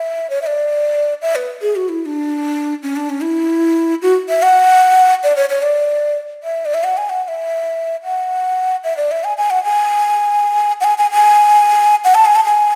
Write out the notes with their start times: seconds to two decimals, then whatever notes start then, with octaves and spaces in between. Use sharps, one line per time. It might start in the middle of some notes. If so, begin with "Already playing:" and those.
Already playing: E5
0.30 C#5
0.42 E5
0.46 D5
1.22 E5
1.35 B4
1.61 G#4
1.76 F#4
1.89 E4
2.02 E4
2.05 D4
2.83 C#4
2.96 D4
3.09 C#4
3.22 E4
4.02 F#4
4.29 E5
4.42 F#5
5.23 D5
5.36 C#5
5.49 C#5
5.62 D5
6.43 E5
6.65 D5
6.74 E5
6.84 F#5
6.97 G#5
7.09 F#5
7.24 F#5
7.28 E5
8.04 F#5
8.84 E5
8.97 D5
9.11 E5
9.24 G#5
9.37 G#5
9.50 F#5
9.64 G#5
10.80 F#5
10.84 G#5
10.98 G#5
11.11 G#5
12.04 F#5
12.14 A5
12.25 G#5
12.35 A5
12.44 G#5